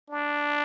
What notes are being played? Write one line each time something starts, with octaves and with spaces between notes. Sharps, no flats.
D4